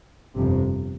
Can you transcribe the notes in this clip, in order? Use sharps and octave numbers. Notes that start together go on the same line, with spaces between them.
G1 F2 C3